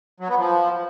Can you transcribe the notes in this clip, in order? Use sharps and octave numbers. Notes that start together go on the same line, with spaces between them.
F#3
B3
F3